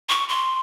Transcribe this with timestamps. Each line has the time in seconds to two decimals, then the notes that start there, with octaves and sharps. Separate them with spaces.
0.09 C#6
0.29 C6